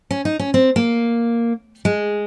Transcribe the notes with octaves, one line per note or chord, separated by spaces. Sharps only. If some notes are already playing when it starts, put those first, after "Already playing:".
C#4
D#4
C#4
C4
A#3
G#3